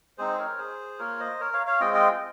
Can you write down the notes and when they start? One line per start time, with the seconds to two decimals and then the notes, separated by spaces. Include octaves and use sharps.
0.18 G#3 C4 D#4 G#4 C5
0.38 A#4 C#5
0.58 G#4 C5
0.99 A#3 F4 A#4 C#5
1.20 C5 D#5
1.40 A#4 C#5
1.53 C#5 F5
1.67 C#5 F5
1.80 G#3 C4 F4 D#5 G5
1.94 D#5 G5